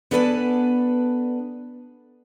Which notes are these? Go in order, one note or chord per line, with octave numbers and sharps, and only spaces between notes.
B3 D4 A4 B4 G#5 A5